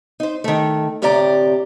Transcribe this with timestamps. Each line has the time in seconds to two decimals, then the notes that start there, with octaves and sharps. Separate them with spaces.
0.20 D#4 C5
0.44 D#3 A3
1.02 D2 A2 C3 G4 D5 A#5